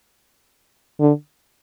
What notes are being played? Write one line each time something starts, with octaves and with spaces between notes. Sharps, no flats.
D3